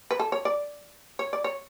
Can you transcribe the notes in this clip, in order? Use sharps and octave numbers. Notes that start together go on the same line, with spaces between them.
B4
A4
C#5
D5
C#5
D5
C#5